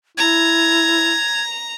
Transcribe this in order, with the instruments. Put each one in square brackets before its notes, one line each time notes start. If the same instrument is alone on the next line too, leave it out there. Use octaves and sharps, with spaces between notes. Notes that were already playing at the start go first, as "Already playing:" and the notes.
[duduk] E4 [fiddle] A#5 [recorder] G#6